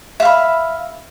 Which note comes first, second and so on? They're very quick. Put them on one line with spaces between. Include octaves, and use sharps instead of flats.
E5 F5 B5